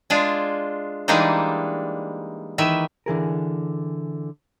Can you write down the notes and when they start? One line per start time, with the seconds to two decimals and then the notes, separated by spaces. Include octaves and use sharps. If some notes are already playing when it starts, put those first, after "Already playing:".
0.10 G#3 D4 F4 G#4
1.08 E3 G3 G#3 A#3 D4 D#4
2.58 D#3 E3 E5
3.06 D3 E3 G#4 A#4